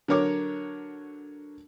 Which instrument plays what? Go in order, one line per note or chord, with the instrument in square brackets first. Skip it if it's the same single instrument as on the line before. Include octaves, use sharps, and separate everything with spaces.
[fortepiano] D3 F#3 A#4 C#5 D6